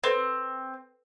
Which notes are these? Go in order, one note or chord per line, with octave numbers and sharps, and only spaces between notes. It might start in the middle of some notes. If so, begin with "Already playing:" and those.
C4 A4 B4 C5